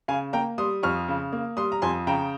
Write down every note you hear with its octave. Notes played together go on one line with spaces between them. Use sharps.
C#3 F5 G#5
A#3 G5 A#5
G3 C6 D#6
F2 C#6 F6
C#3
A#3
G3 C6 D#6
A#5
F2 G#5 C6
C#3 G5 A#5